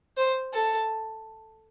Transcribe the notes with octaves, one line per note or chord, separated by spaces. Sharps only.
C5
A4